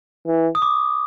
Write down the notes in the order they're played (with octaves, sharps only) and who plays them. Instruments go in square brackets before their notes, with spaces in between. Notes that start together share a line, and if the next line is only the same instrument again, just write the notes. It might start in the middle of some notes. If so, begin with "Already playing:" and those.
[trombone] E3
[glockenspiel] D#6
D6